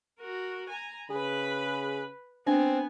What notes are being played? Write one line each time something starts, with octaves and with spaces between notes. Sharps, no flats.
F#4 A#4
G#5 A#5
C#3 G#4 B4 B5
B3 C4 D4 G#5